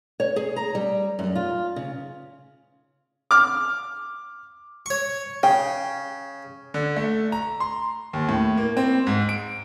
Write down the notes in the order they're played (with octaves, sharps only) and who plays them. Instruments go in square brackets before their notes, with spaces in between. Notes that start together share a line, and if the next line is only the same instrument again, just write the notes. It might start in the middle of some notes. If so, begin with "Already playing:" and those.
[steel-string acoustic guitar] C#5
G#4
A#5
G3
F#2
F4
C#3
[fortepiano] D6 F6
[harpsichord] C#5 C#6
[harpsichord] C#3 [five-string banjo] G5
[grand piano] D3
A3
A#5
C6
D#2
A2
A#3
C4
G#2
D7